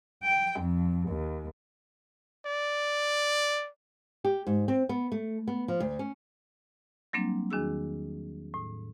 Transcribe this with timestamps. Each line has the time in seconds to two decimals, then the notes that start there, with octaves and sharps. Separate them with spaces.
0.23 G5
0.59 F2
1.08 D#2
2.46 D5
4.25 G4
4.47 G#2
4.68 C4
4.89 B3
5.12 A3
5.48 B3
5.68 F3
5.80 D2
5.99 C#4
7.13 F#3 G3 A#3 C4 D4
7.50 E2 D#3 D4 F#4 G#4 E6
8.54 A2